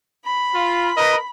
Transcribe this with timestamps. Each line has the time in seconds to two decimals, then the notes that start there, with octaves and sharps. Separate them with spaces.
0.24 B5
0.55 F4
0.97 A#4 B4 D#5